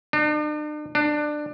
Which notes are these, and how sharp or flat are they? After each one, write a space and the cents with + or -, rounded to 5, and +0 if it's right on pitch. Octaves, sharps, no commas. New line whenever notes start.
D4 +45
D4 +20